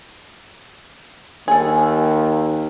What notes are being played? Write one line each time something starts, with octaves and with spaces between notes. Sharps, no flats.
D#2 G#4 A4